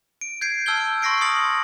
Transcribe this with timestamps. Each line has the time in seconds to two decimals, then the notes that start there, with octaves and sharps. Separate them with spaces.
0.21 D7
0.41 G6 G#6 C7 D7
0.66 A5 E6 F6 G6 G#6 G7
1.02 C6 C#6 F6 A#6 C7 D7
1.21 C6 D#6 A6 A#6 C#7 F#7